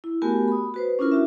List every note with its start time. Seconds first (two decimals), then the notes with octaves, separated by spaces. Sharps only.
0.04 E4
0.22 A3 B3 F#4 G4 A#4 G#5
0.48 B5 D#6
0.74 F#4 B4 C5
0.99 C#4 D4 E4 F4 A#4
1.12 E4 F#4 E5